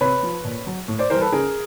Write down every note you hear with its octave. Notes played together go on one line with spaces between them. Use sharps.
C3 B4 C#5
F3
A#2
F#3
A2
C5 D5
E3 G3 A#4 C5
A4 B4
C#3 G#4 A#4